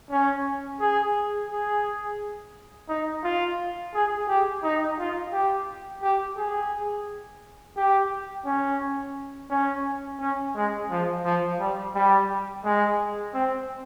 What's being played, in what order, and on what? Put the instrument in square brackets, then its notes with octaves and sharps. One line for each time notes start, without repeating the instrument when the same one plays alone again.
[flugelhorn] C#4
G#4
G#4
D#4
F4
G#4
G4
D#4
F4
G4
G4
G#4
G4
C#4
C#4
C#4
G#3
F3
F3
G3
G3
G#3
C4